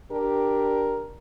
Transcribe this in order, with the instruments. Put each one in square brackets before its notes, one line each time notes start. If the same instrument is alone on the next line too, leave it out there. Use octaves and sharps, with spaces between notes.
[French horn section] D4 G4 [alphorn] A#4